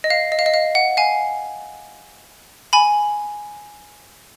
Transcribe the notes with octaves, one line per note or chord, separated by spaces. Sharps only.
D#5
F5
D#5
F5
D#5
F5
F#5
F5 G#5
G#5 B5